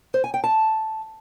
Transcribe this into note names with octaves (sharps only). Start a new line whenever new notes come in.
C5
G#5
G5
A5